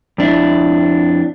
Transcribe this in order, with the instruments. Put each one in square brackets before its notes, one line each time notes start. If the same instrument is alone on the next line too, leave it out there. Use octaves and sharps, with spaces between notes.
[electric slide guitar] F2 D4 E4